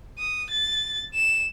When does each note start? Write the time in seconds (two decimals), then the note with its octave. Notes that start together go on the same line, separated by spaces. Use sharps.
0.19 D#6
0.51 A6
1.14 E7